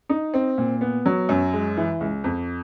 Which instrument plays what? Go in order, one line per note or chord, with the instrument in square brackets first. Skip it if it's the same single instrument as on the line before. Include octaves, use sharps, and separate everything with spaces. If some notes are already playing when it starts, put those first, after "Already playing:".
[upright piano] D#4
C4
A#2
B3
F#3
F#2
G#3
E3
C#2
F2